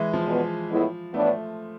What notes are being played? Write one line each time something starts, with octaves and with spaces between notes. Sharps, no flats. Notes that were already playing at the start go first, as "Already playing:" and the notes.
Already playing: E3 G#3
F3
E2 B2 B3
A2 G#3 B3 E4
A2 E3 A3 B3 D4